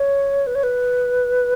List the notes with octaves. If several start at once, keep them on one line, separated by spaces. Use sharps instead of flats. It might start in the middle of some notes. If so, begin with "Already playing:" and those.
Already playing: C#5
B4
C#5
B4